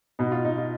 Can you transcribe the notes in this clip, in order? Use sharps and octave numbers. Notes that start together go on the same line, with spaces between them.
B2 D#4
F4
B2 D#4
F4